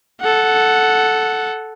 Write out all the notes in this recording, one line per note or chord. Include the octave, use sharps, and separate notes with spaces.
A4 F#5